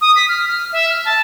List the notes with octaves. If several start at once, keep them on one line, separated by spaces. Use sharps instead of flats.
D#6
B6
F6
F6
E5
F6
A5